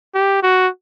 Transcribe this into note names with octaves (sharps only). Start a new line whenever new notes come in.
G4
F#4